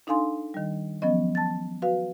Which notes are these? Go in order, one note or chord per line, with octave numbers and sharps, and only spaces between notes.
D4 D#4 A4 F5 G#5 C6
D#3 G3
F3 F#3 B3 C#4 D#5
A5 A6
F#4 B4 F5